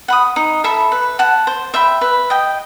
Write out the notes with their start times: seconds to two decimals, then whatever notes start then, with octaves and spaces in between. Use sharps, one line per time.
0.08 F#5 B5 D#6
0.36 D#4
0.64 A4 E5 B5
0.92 B4
1.19 F#5 A5
1.47 C5
1.74 E5 G5 B5
2.01 B4
2.30 D#5 G5